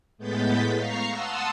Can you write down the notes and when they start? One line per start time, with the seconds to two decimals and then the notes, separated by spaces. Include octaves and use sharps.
0.18 A2 G#3 B3 G6 A6 B6
0.75 F5 A#5 C#6 F6 C7
1.10 F#5 A5 C6 D#6 E6